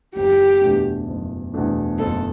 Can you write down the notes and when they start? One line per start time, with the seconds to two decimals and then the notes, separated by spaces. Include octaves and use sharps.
0.16 F#1 G4
0.61 E2 B2 A3 D4
1.07 F#1
1.54 E2 B2 A3 D4
1.99 F#1 A4